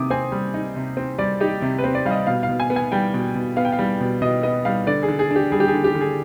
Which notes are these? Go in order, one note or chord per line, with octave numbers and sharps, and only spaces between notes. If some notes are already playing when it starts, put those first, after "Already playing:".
Already playing: C3 D6 D#6
C4 G#5
G3
D#4
C3
C4
G3 D5
D#4 G4
C3
B4
C4
D5
G3 F5
D#5
B2 F5
F5
B2
G#5
B3
G#5
G3 G5
B2
B2
B3 F5
G5
F5
G3
B2
B2 D#5
B3 D#5
G3 F5
D3 D5
G#4
D3
G#4
D4
G4
G3 G#4
G4
G#4
D3
G4
D3
G#4